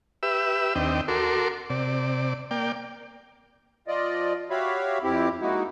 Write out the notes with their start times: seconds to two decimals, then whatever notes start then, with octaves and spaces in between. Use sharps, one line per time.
0.23 G4 B4 E5 E6
0.75 D#2 C4 D4 D#5 G5
1.08 F#4 A4 A#4 C6 D6
1.70 C3 D5
2.51 A#3 D5 G5
3.88 F3 F4 D5 D#5
4.50 F#4 G4 C#5 E5 F5 B5
5.03 F2 C4 E4 G4
5.41 G#3 A#3 D#4 E4 F#4